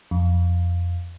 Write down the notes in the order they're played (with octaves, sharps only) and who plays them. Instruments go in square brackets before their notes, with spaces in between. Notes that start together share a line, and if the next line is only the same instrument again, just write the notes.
[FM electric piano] F2